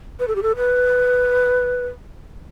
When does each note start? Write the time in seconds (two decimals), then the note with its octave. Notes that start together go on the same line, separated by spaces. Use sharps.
0.20 B4
0.28 A4
0.35 G4
0.42 A4
0.57 B4